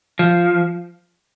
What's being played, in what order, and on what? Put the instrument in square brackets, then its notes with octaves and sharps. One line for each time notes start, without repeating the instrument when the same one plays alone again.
[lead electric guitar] F3